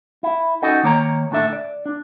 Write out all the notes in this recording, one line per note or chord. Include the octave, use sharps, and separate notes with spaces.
E4
C#4 D#4 F#4 A4 D#5
D#3 A#3 C#5 A#5
D2 A2 D4 A4 E5
D5
D4